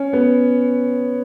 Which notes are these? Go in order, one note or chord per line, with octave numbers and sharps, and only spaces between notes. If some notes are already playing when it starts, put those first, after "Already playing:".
Already playing: C#4
B3